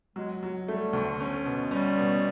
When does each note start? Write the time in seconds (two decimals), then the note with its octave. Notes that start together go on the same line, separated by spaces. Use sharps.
0.16 F#3 G#3
0.43 F#3
0.68 G3 A3
0.93 D2
1.20 C#4
1.45 B2
1.71 G3 C#4
1.97 B2